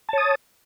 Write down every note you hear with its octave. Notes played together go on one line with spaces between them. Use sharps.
C#5 A5 D#6